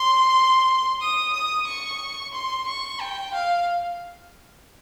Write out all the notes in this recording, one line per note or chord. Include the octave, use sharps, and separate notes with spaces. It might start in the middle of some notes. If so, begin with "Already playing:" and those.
Already playing: C6
D#6
D#6
C#6
C6
C#6
G5
F5